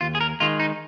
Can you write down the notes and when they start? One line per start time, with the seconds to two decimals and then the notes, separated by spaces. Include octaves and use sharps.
0.01 D#2 F4
0.15 G#4
0.21 A#4
0.40 D#3 G#3 F4
0.60 D#4